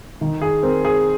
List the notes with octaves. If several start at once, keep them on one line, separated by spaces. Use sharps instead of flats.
D#3
G#4
C4 A#4
G#4